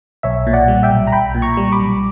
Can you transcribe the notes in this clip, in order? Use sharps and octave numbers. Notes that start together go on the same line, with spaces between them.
B1 C#5 E5
A#2
D5 F#5
G3
E5 G5
B1
A#5
B1 G5 B5
A#2
A#5 C#6
G3
B5 D6
B1